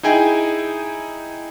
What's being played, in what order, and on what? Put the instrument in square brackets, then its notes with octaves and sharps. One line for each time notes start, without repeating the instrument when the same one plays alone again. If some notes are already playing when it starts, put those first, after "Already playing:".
[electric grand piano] D#4 E4 G#4 G5 G#5